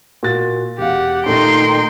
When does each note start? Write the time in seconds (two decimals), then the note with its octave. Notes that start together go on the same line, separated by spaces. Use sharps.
0.23 A#2 F#4 A6
0.78 E1 G4 F5 F#5
1.26 A#2 D#3 A3 D#4 G5 C6